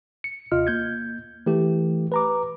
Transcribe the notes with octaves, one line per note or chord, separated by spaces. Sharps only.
C#7
D#2 C3 F4 D#5 F6
A#3 G6 G#6
E3 A3 G4
B4 A#5 D6